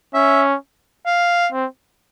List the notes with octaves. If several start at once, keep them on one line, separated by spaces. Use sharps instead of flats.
C#4 E5
F5
C4